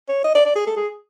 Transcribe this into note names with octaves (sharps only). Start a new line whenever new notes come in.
C#5
D#5
D5
D5
G#4
A4
G#4